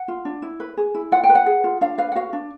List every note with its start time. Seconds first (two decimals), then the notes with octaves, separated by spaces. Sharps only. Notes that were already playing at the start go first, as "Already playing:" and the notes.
Already playing: F#5
0.08 F4
0.25 D4
0.42 E4
0.60 B4
0.77 G#4
0.94 E4
1.12 F4 F#5
1.24 G5
1.29 B4
1.35 F#5
1.46 G#4
1.64 F4
1.81 D4 F5
1.98 B4 F5
2.12 F#5
2.15 F#4 F5
2.33 D4